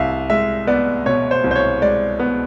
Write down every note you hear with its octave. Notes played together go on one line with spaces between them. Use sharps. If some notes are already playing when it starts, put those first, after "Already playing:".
Already playing: C2 E5 F5
G#3 E5
B3 D5
B2 C#5
C5
C2
C5
C#5
G#3 D5
B3